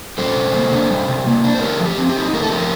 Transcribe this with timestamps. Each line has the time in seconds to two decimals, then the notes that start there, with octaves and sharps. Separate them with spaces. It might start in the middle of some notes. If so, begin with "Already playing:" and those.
0.18 G3 A4 C5
0.36 C3
0.54 A#3
0.72 D4
0.90 G3
1.09 C3
1.27 A#3
1.44 D4
1.55 C5
1.61 A3 G4 A#4
1.79 F3
1.85 G4
1.98 C4
2.09 G4
2.16 D#4
2.33 A3 A#4
2.43 A4
2.50 F3 G4 A#4